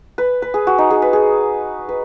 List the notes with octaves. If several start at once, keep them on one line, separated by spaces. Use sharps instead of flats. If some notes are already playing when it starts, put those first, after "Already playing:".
B4
B4
G#4
F#4
D#4
G#4
B4
G#4
B4